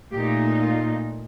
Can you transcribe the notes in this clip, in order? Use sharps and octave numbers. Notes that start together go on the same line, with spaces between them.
A#2 A3 D#4 G4
F4